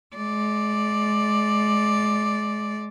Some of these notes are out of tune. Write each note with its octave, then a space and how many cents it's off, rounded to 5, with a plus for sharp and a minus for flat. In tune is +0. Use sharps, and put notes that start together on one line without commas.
G#3 +30 D5 +0